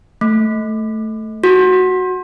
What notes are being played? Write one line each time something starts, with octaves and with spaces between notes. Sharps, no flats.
A3
F#4